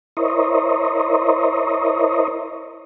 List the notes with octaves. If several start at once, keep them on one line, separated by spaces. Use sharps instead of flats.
E4 A#4 C5 C#5 D#5